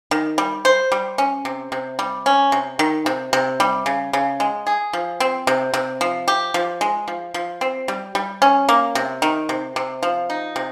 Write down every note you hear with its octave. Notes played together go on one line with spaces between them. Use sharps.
D#3
G3
C5
G3
C#4
C3
C3
G3
C#4
C3
D#3
C3
C3
G3
C#3
C#3
G#3
G#4
F3
C4
C3
C3
F3
G4
F3
G#3
F3
F3
C4
G3
G3
C#4
A#3
C3
D#3
C3
C3
F3
D#4
C3